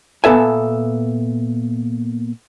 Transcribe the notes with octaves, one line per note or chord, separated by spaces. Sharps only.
A#2 B3 A4 E5 G#5